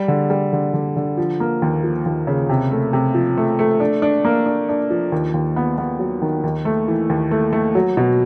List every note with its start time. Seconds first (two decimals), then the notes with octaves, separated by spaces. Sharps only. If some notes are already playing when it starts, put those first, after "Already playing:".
Already playing: G3
0.08 D3
0.30 G3
0.53 D3
0.73 D3
0.96 D3
1.18 F3
1.40 A#3
1.62 D#2
1.84 F3
2.06 D#2
2.27 C#3
2.49 C3
2.71 A3
2.93 C3
3.14 F3
3.37 A3
3.59 A3
3.80 D4
4.02 D4
4.25 A#3
4.46 D4
4.69 D4
4.90 F3
5.12 D#2
5.34 D#2
5.56 B3
5.78 B3
5.99 F#3
6.22 D#3
6.43 D#2
6.65 A3
6.88 E3
7.09 D#2
7.31 A3
7.53 A3
7.75 F#3
7.97 B2